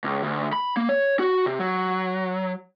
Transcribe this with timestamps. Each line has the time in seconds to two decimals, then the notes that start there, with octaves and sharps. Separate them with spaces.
0.04 C#2
0.23 D2
0.53 B5
0.77 A#3
0.89 C#5
1.19 F#4
1.46 C3
1.59 F#3